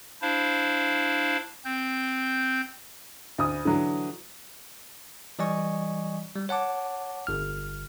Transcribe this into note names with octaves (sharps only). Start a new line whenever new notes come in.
D4 E4 C5 F5
C4 G6
D2 D#6
D3 E3 F#3
E3 G3 D5 D#5 G#5 C#6
G3
C#5 F#5 A5 D6
G1 F6